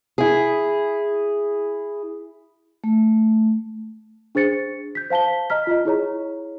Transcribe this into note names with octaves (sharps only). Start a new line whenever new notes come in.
E4 G#4
A3
D4 G#4 C5 A6 C#7
G6 B6
C5 F5 A5 B6 G7
D#5 A#5 F6 B6
F4 D#5
E4 G#4 C#5 A#5